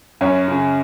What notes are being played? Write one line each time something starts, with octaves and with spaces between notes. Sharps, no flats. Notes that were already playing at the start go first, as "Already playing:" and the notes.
F#2 C#4 C#5
C#3